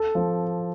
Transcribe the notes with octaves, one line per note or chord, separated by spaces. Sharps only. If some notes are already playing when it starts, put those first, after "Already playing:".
Already playing: A4
F3